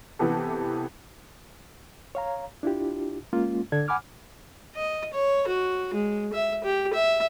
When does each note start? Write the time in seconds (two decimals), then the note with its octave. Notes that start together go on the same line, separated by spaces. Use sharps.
0.19 C3 E3 B3 G4 A4
2.15 C#5 F5 A#5
2.63 D4 E4 F4 G4
3.33 G#3 A#3 C#4 F4
3.72 D3 D4 A4 D5 G#6
3.88 F#5 G#5 B5 D6 F6
4.75 D#5
5.13 C#5
5.47 F#4
5.93 G#3
6.33 E5
6.64 G4
6.93 E5